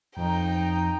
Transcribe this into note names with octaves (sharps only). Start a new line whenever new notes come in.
F2 D#4 G5 A#5